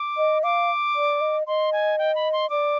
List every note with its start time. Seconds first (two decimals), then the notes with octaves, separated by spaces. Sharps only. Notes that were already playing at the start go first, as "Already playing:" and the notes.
Already playing: D6
0.17 D#5
0.43 F5 D6
0.96 D5
1.21 D#5
1.47 D#5 C6
1.73 G#5
1.99 G5
2.15 B5
2.33 C6
2.50 D5 D6